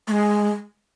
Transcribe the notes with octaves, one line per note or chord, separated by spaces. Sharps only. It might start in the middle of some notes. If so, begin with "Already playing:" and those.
A3
G#3